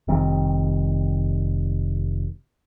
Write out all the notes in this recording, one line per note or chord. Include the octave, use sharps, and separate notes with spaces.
F1 D#3 G3 C4